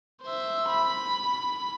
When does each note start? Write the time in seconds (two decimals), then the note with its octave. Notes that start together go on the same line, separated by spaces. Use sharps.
0.22 C5 E5
0.69 B5